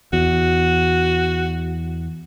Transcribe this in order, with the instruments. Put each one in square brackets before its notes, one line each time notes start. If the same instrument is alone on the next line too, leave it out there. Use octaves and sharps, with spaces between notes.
[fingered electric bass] E2 [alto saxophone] F#4